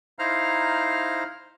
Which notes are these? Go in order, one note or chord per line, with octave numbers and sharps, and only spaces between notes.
D#4 E4 C5 F5 A#5 F6